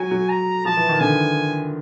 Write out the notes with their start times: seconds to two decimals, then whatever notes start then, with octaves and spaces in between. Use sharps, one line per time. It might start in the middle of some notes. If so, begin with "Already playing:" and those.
Already playing: F#3 G#5
0.11 F#3
0.29 A#5
0.65 F3 A5
0.77 E3
0.89 D#3
1.00 D3 G#5